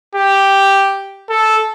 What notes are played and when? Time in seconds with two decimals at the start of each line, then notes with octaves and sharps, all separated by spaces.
0.15 G4
1.30 A4